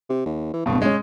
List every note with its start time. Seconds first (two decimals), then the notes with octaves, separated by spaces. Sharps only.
0.10 C3
0.26 D#2
0.54 E3
0.66 D1 G2 B2
0.82 G#3 C#4